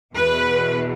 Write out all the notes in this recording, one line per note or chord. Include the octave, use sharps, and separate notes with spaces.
E2 B2 B4